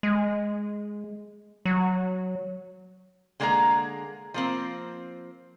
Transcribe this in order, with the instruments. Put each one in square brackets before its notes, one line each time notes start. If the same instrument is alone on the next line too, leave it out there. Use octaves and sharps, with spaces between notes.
[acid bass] G#3
F#3
[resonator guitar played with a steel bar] D3 G#3 A#3 G#4 D5 A#5
F3 A#3 C4